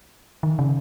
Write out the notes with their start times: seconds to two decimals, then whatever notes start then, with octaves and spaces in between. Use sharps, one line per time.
0.43 D#3
0.59 C#3